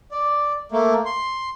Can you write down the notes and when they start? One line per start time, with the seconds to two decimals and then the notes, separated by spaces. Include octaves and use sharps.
0.11 D5
0.72 A3 A#3
1.06 C6